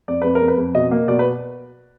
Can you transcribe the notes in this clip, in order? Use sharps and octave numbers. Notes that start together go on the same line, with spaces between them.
F2 D5
F2 B4
A#4
F2
B4
F2
B2 D#5
A#3
B2 D5
B4